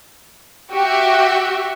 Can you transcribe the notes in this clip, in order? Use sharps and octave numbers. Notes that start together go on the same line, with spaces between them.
F#4 G4 E5